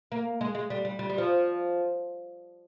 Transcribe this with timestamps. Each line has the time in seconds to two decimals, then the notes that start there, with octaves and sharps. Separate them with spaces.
0.12 A#3
0.41 G#3
0.55 G#3
0.70 G3
0.85 G3
0.99 G3
1.09 G3
1.18 F3